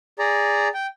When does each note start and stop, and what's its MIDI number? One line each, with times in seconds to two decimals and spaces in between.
0.19 0.68 68
0.19 0.68 74
0.19 0.68 82
0.74 0.87 79